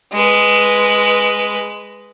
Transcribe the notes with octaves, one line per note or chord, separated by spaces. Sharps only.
G#3 B4